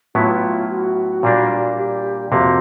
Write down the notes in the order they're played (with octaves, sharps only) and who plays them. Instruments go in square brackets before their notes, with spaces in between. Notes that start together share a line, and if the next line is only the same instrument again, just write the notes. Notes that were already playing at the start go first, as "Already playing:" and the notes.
[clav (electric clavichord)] A2 F#3 B3 E4 [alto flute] F4
[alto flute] F#4
[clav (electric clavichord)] A#2 G3 A#3 D4
[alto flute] G4
[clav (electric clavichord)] F2 C3 F3 A#3 [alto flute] F#4